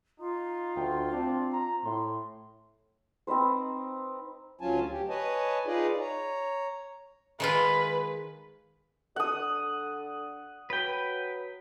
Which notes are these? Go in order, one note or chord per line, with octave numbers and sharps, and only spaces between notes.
D#4 F4
D2 G5
C4 D4
A#5
A2 C6
C4 D#4 B4 C5
D2 F#3 C#4 F4 G#5 A5
G4
B4 C#5 D#5 G#5 A5
D#4 F4 G#4 B4 D5 D#5
C#5 A#5
D#3 G#3 F4 B4
D3 F#5 D#6
F#3 B4 G5